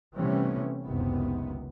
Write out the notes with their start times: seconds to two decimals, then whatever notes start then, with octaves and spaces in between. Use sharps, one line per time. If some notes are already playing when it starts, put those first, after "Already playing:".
0.15 C3 E3 G3 A3 B3 C#4
0.84 F#1 C#2 C3 D#3 B3